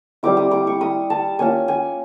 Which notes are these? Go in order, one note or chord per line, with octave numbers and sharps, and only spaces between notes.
G3 C4 E4 D6
D#6
D6
C#6
D#6
A5
A#3 C#4 F4 G#5
G#5